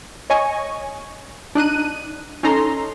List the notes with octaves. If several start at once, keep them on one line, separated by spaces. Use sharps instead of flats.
C#5 D#5 G#5 C#6
D4 D#4 F#6 D#7
C#4 D#4 A4 A#5 C6